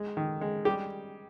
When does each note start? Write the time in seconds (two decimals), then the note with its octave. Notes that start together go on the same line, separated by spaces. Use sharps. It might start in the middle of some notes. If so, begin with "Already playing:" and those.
Already playing: G#3
0.17 D#3
0.41 G#3
0.65 G3 G4